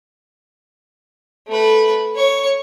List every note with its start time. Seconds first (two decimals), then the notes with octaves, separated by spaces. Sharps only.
1.48 A3 B4
2.15 C#5 C#6